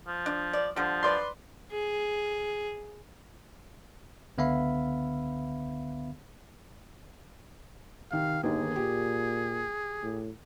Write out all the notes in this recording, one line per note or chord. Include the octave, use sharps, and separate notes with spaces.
F3
D4
D5
D3 F3 G3
B4 D5 C6
G#4
C#2 D3 B3 E5 F5 B5
C3 D#3 F5
G1 D#2 D#3 A#3 G#4
A#2 G4
A2